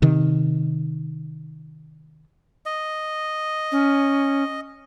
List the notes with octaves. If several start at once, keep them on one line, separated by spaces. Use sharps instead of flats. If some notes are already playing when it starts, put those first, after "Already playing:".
C3 D#3
D#5
C#4